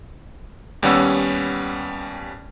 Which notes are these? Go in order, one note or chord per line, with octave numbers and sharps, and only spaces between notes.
D#2 G3 B3 C#4 F#5 E6